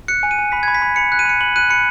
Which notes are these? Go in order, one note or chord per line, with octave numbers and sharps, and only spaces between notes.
F#6 C#7
G#5
D#7
G#5
B5 B6
G#6
B5
B6
B5
B5 C#7
F#6
D#7
B5 C#7
B5 F#7
F#6 D#7
B5 C#7